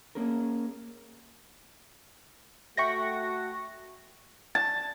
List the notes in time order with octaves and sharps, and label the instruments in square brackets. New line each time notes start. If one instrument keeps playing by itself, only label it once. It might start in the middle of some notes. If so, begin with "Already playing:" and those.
[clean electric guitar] A#3 C#4 G#4 A#4
[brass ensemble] A3 F#4 [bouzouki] E5 F#5 G5 [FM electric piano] C#6 A#6
[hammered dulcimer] A5